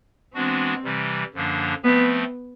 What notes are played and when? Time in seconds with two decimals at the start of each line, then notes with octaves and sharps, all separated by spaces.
0.34 E3 G#3 B3 C4 D4 F#4
0.84 C3 E3 G3
1.34 F#2 D3 F3 A#3 D4
1.84 F3 A3 B3 C4